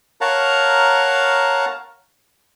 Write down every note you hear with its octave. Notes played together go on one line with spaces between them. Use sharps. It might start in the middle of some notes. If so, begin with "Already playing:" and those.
A#4 C#5 F5 F#5 A5 A#5